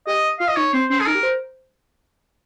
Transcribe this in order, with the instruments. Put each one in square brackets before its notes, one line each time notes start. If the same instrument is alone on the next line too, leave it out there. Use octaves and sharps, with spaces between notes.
[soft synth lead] G4 [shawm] D#5
[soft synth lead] F4 [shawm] F5
[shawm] D#5
[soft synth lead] D#4 [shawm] C#5
[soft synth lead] C4 [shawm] C5
[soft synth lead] C#4 [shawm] C5
[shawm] G#4
[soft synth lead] D#4 [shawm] A#4
[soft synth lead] G4
C5